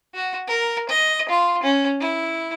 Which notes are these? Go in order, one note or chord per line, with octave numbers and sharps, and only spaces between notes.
F#4
A#4
D#5
F4
C#4
E4